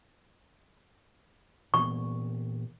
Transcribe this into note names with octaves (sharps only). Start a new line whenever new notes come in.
A#2 E3 B3 C#6